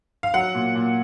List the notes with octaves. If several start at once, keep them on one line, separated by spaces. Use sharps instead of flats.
F5
F#3 F#5
A#2
A#2